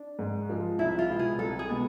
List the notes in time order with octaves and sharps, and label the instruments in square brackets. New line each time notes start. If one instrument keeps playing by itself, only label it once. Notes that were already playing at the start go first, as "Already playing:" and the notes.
Already playing: [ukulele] D4
[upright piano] G#2
F3 G#3
[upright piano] C2 [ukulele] E4
[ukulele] F4
[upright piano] B2 G#3 B3
[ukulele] G#4
[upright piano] C2 [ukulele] A4
[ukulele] G#4
[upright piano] B2 G#3 B3